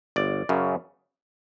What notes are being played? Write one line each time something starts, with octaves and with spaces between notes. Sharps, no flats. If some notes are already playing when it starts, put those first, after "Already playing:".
G1 D5
F#2 C#3